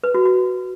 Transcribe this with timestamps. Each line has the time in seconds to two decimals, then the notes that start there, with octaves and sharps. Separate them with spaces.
0.04 B4
0.15 F#4
0.25 F#4